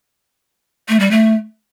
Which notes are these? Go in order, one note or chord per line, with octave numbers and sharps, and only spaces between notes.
A3
G3
A3